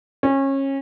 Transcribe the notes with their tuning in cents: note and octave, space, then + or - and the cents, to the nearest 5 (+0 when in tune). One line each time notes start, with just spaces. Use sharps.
C#4 -25